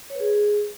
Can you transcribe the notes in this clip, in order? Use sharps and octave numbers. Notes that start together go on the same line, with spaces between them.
C#5
B4
G#4